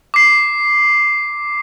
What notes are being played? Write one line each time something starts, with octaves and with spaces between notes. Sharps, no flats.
D6 C7